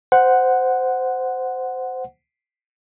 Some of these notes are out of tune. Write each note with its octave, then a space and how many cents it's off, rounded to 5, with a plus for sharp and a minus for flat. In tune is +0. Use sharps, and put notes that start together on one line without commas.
C5 -15 F#5 +0